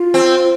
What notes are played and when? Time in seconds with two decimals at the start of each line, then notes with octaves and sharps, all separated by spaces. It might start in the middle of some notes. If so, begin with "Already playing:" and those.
Already playing: F4
0.14 C4